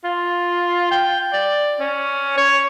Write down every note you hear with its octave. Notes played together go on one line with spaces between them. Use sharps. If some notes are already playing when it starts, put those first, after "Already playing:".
F4
G5
D5
C#4
C#5